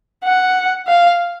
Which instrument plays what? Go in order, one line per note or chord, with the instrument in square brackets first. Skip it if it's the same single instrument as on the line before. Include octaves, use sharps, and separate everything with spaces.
[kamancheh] F#5
F5